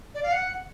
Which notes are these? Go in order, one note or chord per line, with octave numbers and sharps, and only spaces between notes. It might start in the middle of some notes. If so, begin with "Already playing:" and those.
D5
F5
F#5